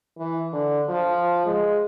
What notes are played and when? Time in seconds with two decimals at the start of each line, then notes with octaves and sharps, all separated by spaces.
0.18 E3
0.53 D3
0.89 F3
1.46 G#3